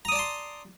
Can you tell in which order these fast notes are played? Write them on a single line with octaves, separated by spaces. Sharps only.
A#5 D#6 D5 A5 C6